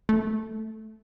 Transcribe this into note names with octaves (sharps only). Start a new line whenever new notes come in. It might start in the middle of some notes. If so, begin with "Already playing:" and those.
A3